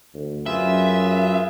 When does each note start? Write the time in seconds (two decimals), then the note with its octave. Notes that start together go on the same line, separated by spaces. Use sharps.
0.14 D2
0.46 F#2 F4 G#4 B4 E5